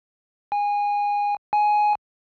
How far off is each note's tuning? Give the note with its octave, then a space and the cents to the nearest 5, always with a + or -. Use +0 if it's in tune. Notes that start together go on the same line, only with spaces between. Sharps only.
G#5 -20
G#5 +10